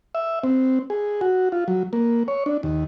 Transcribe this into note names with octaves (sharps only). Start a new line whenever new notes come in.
E5
C4
G#4
F#4
F4
F#3
A#3
C#5
D4
D#2